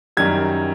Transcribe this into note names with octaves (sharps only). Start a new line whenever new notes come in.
F#2 D#3 G3 G#6